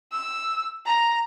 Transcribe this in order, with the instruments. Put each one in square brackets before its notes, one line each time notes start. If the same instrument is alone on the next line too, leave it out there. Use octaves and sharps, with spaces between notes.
[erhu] E6
A#5